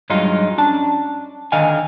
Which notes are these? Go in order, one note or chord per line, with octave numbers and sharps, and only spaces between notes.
G2 F#3 G#3 D#4 F4
C#4 D4 A5
D3 D#3 D#5 F5 G#5